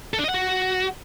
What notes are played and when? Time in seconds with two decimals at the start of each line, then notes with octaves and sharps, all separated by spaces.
0.14 A4
0.19 D4
0.24 D#5
0.29 F#5
0.34 F#4